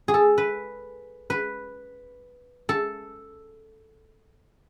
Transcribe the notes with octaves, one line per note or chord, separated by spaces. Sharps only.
G#4
A4
B4
B4
A4